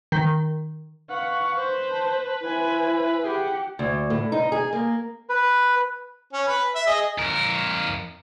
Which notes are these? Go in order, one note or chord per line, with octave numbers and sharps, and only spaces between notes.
D#3
B4 F5 F#5 C#6
C5
A5
E4 C5 G#5
G4 G#4 F#5
D2
A2
D#4
G#4
A#3
B4
C#4
B4 B5
E5
G#4 D#5
F2 A#4